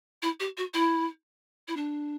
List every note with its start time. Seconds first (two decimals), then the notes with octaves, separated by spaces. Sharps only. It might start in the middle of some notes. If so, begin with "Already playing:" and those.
0.22 E4
0.40 G4
0.57 F#4
0.74 E4
1.68 E4
1.76 D4